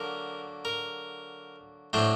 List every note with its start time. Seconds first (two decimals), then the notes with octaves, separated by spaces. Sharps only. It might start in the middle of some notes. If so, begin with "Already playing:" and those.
Already playing: D3 F#3 A#3 A#4
0.65 A#4
1.93 A2 F#3 A3 D4 C5